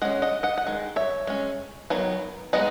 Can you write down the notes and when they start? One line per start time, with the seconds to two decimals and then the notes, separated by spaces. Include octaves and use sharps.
0.02 G#3 C#4 D#5 F#5
0.22 D#5 F#5
0.43 D#5 F#5
0.58 F#5
0.67 D#3 G#3
0.96 C#5 E5
1.27 G#3 C#4
1.90 D#3 F#3 B3
2.53 G#3 B3 D#4 B4 D#5